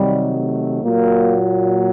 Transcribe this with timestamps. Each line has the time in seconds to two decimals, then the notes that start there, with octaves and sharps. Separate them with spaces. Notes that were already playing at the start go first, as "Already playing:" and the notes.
Already playing: C3 D#3 F#3 G3
0.35 A3
0.84 A#2 F#3 A#3